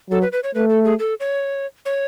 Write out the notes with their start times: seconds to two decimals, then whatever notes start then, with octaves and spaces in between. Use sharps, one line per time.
0.10 F#3 A4
0.22 B4
0.32 B4
0.44 C#5
0.55 A3 B4
0.69 A4
0.84 G#4
0.99 A4
1.20 C#5
1.86 C#5